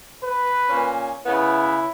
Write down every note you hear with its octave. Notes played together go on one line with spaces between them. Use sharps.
B4
A#2 C#4
C#3 B3 E4